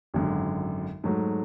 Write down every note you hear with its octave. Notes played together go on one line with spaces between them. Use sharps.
G#1 F#2 D3
G#2 F#3 A3